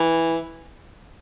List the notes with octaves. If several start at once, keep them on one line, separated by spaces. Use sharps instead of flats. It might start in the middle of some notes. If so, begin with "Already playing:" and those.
Already playing: E3